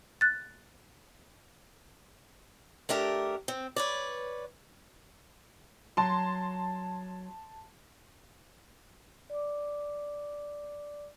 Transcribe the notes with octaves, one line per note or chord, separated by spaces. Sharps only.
F#6 A6
A3 D4 G4 A#4
C4
B4 C#5 D5
F#3 A5 C6
D5 D6